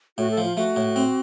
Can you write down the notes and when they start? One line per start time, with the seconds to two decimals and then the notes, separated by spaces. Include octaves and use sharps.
0.18 A2 F#4
0.31 A4
0.37 F3
0.44 F4
0.57 A3 F#4
0.76 A2
0.96 C4